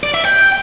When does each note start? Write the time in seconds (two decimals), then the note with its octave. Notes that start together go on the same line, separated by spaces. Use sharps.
0.03 D5
0.14 E5
0.25 G5